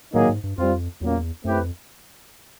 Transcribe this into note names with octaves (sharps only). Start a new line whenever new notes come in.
A2 D#3 F#3 A#3 D#4 G#4
G#2
G2
F2 G3 C4 F4
E2 A#2 F#3 A#3 C#4
F#2 A3 C4 E4 G4 B4
F2